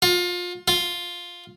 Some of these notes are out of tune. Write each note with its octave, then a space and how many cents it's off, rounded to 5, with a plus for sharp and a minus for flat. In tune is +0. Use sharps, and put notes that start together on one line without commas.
F4 +25
F4 +5